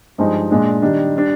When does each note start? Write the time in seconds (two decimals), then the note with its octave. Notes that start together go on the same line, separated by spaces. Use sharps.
0.18 G2 F3 G#3 D#4
0.51 A#2 G#3 D4
0.82 D#3 G3 D4
1.16 G3 D4